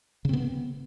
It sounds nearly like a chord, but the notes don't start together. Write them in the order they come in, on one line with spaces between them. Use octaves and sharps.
C#3 C4 B3